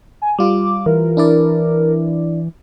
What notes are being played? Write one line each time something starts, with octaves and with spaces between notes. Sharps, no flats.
G#5
G3 F4 D6
E3 A#4
D4 E4 D5